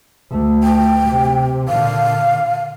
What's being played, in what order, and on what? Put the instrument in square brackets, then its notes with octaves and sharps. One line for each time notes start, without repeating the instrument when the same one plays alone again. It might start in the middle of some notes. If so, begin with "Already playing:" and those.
[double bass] D2 A3
[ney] G5
[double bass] C3
[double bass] A#2 D3 [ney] F5